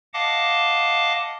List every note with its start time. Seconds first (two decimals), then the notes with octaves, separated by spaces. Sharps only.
0.14 D#5 F5 F#5 A5 D6